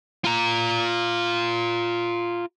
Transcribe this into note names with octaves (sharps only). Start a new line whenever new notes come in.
F4 A#5